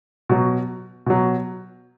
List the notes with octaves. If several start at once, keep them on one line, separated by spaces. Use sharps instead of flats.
B2 F#3
B2 F#3